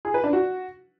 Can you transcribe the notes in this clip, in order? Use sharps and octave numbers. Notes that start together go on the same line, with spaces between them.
G#4
B4
D4
F#4